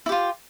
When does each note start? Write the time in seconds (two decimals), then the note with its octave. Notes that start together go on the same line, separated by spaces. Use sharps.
0.06 E4
0.09 G4
0.12 F4